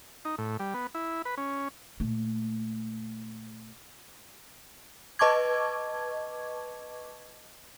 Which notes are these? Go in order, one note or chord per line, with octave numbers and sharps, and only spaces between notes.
D#4
A2
G3
B3
E4
B4
C#4
A#2 A3
B4 D#5 A5 C#6 D6 G#6